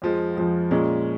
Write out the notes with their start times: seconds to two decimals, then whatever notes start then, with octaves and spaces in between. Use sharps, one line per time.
0.02 F2 F3 G#3
0.36 F2 F3 G#3
0.71 A#2 G#3 C#4